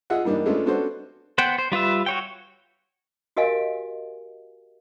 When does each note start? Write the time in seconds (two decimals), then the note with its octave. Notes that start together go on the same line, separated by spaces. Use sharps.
0.10 F4 G#4 D#5 E5 F#5
0.24 E3 G3 A#3 D4 D#4
0.46 G#3 A3 B3 C#4 D4 F4
0.66 B3 C#4 D4 F#4 A4 C5
1.38 B3 C5 F#5 G5
1.58 C5
1.72 G3 F4 B4 E5
2.06 F#4 C#5 G5
3.37 F#4 G4 A#4 D#5 F5 G#5